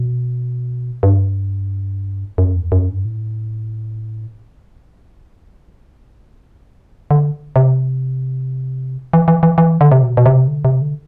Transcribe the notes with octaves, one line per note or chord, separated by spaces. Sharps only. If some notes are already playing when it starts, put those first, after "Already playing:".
Already playing: B2
G2
F#2
E2
F#2
G2
A2
D3
C3
E3
E3
E3
E3
D3
C3
B2
B2
C3
D3
C3
D3